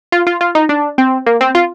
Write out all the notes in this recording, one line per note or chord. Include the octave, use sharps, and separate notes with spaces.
F4
F4
F4
D#4
D4
C4
A#3
C4
F4